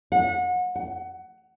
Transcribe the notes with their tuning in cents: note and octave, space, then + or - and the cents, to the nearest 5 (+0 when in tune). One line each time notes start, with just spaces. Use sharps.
F#5 -30
F#5 +20